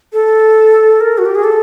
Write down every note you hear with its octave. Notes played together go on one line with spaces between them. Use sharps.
A4
A#4
F#4
G4
G#4
A4